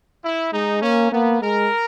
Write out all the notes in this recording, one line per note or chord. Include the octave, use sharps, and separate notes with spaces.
E4
G#3 D#4
A#3 C#4
A#3 B3
G#3 A#4